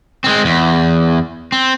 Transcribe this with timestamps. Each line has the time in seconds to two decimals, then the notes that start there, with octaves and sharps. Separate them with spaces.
0.24 G#3 C4
0.45 E2
1.52 C4